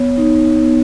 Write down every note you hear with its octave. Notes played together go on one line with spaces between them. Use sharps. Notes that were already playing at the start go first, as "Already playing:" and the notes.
Already playing: B3 C#5
D#4
B3